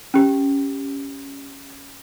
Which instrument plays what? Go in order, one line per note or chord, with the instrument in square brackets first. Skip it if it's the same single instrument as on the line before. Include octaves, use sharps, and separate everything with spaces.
[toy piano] C#4 G4